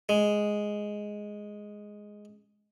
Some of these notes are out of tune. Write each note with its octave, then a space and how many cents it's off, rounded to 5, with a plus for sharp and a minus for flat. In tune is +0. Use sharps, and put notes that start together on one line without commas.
G#3 +0